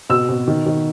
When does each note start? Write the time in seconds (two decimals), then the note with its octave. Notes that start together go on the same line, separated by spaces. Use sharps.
0.10 B2 E6
0.29 B2
0.48 D#3
0.66 D#3